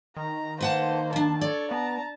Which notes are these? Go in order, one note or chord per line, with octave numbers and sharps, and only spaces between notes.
D#3 A#5
A#3 B4 C5 F#5 A5
D#2 D4 A5
A4 C#5 D5
B3 A5 A#5